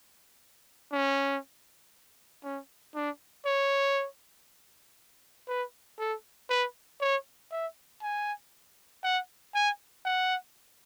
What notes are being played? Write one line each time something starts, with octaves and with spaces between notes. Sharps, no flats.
C#4
C#4
D4
C#5
B4
A4
B4
C#5
E5
G#5
F#5
G#5
F#5